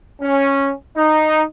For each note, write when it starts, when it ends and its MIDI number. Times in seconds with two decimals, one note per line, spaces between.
0.21 0.71 61
0.97 1.43 63